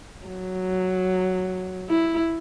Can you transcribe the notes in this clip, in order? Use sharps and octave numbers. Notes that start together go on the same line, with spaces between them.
F#3
E4